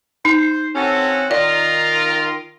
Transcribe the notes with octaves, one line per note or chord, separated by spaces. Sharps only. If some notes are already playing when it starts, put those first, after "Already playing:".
D#4 C5
C4 C#4 F#4 A4
D#3 F4 A#4 D5